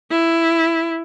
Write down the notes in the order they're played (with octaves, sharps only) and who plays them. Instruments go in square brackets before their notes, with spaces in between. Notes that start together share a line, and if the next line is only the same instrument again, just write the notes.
[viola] E4